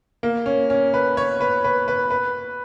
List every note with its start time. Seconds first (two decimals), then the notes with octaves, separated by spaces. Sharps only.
0.23 A#3
0.46 C#4
0.70 C#4
0.94 B4
1.17 C#5
1.41 B4
1.64 B4
1.88 B4
2.10 B4